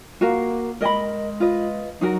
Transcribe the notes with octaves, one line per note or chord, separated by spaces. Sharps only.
A#3 F#4 A#4 F5
G#3 A#4 D#5 G#5 B5
F4 B4 D#5
F#3 D#4 F#4 A#4